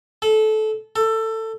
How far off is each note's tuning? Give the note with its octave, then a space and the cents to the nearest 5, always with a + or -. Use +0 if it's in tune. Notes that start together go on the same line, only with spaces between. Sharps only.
A4 -20
A4 +20